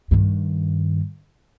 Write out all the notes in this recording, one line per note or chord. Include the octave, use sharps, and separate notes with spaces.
G2 D#3